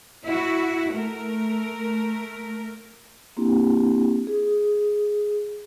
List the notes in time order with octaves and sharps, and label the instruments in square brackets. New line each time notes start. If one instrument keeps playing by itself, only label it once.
[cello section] E4 F#4
A3 A#4
[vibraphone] A#3 C4 D4 E4 G4
G#4